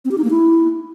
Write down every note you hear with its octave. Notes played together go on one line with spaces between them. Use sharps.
C4
G4
D#4
A#3
E4